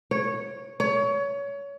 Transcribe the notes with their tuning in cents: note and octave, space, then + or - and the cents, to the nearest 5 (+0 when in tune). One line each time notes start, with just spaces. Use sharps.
C#5 -10
C#5 +25